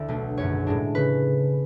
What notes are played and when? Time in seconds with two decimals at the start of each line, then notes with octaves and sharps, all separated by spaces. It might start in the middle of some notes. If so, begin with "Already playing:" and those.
Already playing: D2 D3 E4 D5
0.08 B1 B2 A3 D4
0.37 G#1 F#2 D3 C#5
0.67 A2 G#3 D4
0.95 C#3 B4